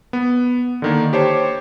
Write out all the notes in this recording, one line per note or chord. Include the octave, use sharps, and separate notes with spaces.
B3
D3 D#3 A#3
G4 C5 C#5 A5